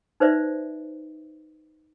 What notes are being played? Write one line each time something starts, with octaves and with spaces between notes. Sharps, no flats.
D#4 B4 C5 D5 E5